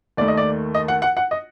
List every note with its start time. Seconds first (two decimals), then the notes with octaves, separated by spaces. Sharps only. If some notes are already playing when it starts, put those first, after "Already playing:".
0.17 D#2 D#3 A3 D5
0.28 D#5
0.37 D5
0.75 D#5
0.88 F#5
1.02 F#5
1.17 F#5
1.31 D#5